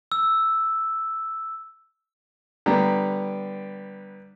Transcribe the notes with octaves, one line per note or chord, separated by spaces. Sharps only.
E6
D3 G3 B3 A#5